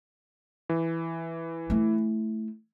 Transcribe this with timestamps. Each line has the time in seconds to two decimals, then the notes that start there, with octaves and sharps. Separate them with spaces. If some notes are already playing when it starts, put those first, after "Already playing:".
0.69 E3
1.70 A3 E4